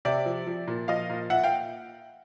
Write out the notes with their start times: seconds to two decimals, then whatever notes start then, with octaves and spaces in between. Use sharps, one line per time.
0.05 C3 D5 E5
0.26 F3
0.47 F3
0.67 A#2
0.88 F3 D#5 F5
1.10 A#2
1.30 A#2 E5 F#5
1.44 F5 G5